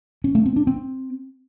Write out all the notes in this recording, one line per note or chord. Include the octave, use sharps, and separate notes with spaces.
C#4
A3
C4
D4
C4